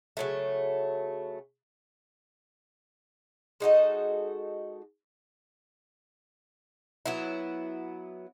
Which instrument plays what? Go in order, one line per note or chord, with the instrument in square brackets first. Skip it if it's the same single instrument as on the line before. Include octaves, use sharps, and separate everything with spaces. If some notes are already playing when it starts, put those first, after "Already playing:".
[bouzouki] C#3 F#3 A3
G#3 D#4 F#4 A4
F#3 B3 E4